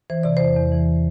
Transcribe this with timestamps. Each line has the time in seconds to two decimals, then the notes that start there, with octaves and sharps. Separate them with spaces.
0.10 E3 C5
0.23 C3 D5
0.37 E2 C5
0.56 E2
0.72 E3